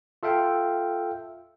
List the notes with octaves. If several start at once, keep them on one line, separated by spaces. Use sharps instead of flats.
F4 A4 E5 F5 G5